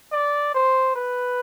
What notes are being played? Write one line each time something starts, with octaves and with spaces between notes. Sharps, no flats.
D5
C5
B4